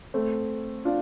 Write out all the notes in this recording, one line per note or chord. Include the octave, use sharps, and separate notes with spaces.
A3 C4
D4 F4